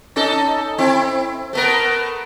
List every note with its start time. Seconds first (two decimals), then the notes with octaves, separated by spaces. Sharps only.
0.16 C#4 D#4 A4
0.78 C4 E4
1.53 A3 B3 A#4